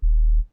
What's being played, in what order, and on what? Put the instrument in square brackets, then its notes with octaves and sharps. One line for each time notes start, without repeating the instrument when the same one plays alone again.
[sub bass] D#1